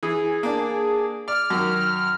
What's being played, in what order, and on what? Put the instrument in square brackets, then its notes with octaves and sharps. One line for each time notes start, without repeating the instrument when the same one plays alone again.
[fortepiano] E3 [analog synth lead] G#4
[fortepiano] A#3 D4
[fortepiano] D5 [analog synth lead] F6
[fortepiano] F#2 D#3